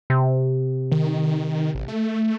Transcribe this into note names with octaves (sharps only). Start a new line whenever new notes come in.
C3
D#3
A1
A3